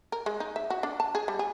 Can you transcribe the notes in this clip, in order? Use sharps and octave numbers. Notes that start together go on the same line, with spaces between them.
A#4
G#3
D#4
E5
F#4
D4
A5
G#4
G3
G#4